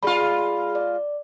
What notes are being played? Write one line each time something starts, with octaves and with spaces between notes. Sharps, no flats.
G#3 F4 G#4 D5 B5
D5